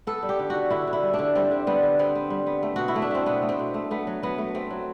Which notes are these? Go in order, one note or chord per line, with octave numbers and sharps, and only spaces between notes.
B3 A4
G3
G4
D3
F#4
D3
D3 E4
D3
E4
G3
D4
D3
G3 C4
D3
G3 B3
D3
B3 C4
B3
G3
B3
A3
B2 F#4
E4
A3
D4
A3 C4
B2 B3
A3
C4
B2
A3
A3 B3
F#3
F#3 B3
A3
A3 C4
F#3